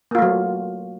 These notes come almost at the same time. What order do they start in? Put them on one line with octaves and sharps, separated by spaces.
A#3 F4 A3 F#3